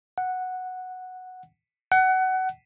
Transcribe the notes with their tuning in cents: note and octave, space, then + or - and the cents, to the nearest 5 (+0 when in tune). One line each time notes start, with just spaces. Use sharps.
F#5 -5
F#5 +20